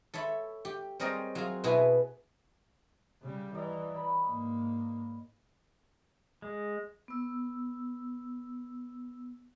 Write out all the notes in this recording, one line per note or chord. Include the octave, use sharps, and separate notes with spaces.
A4 C#5 E5 B5
G4
G3 C4 G#4 A#4 C#5 D#5
F#3 F4 G#4
B2 B3 E4 G#4 B4
C#3 G3
E3 D5 D#5 A#5
C#5 B5
G#2 A#3
G#3
B3 E6